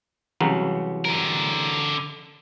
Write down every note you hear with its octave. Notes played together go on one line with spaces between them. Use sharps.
C2 C#3 E3 F#3
D3 A#4